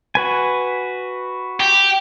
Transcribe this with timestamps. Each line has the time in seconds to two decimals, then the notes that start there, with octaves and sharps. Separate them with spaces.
0.15 F#4 B4 G#5
1.60 G4